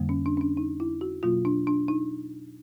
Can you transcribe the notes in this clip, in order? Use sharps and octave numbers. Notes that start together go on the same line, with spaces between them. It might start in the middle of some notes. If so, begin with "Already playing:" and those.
Already playing: F2 D3 G3 A#3
C#4
D4
C#4
D4
D#4
E4
F#4
B2 F#3 A#3 F4
D4
D4
D#4